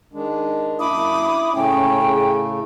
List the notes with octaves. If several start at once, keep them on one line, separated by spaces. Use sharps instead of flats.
D#3 G#3 D4
F#2 A#3 D4 E4 B5 D6 D#6
A2 C#3 A3 C#4 G5
G#4